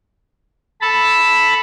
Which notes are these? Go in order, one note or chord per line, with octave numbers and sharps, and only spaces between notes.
A4 A5 B5